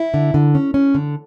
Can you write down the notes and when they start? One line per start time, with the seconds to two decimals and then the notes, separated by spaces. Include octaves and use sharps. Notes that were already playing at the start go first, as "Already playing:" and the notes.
Already playing: E4
0.14 D3
0.34 D3
0.55 C#4
0.74 C#4
0.95 D3